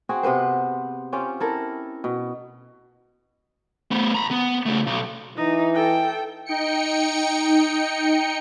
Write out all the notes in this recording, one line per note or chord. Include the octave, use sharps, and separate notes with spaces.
C4 F#4 G#4
C3 B3 B4 C5
C4 C#4 F4 G4
E4 A4 A#4
B2
A3 B3
A#5 B5
B3
C#3 A3
B1
E3 D#4
A4 G5
D#4 G5 C#7